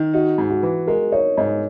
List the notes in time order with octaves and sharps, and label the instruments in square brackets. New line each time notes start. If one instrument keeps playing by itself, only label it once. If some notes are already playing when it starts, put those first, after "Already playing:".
Already playing: [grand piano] D#3
[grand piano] D#4 [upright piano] F#4
[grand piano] G#2
[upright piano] F#4
[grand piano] E3
[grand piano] G#3 [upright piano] A#4
[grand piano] D#4 [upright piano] C#5
[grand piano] G#2 [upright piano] D#5